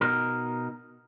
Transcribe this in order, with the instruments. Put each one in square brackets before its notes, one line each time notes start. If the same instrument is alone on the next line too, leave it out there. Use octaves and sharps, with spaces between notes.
[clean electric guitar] B2 D#4 A#4